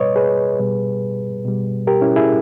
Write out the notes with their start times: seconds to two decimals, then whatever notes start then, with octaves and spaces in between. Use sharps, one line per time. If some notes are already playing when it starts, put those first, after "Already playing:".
Already playing: B2 G3 B4 C#5 D#5
0.16 G#4 B4
0.59 B2 G3
1.45 B2 G3
1.87 G4 A#4
2.01 C#4 E4
2.16 E4 G#4